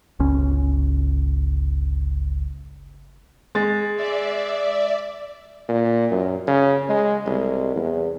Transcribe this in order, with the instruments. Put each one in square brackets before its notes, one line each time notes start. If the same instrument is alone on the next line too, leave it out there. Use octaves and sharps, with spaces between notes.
[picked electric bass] G1 C#2 C#4
[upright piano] G#3 A6
[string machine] D5 E5
[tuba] A#2
F#2
C#3
G#3
C2
E2